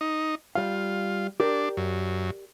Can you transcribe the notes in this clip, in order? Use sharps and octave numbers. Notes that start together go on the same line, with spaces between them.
D#4
G3 F4 F5
D4 G4 A#4 D5
F#2